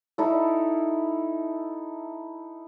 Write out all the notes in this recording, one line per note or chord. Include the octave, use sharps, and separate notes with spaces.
D#4 E4 A4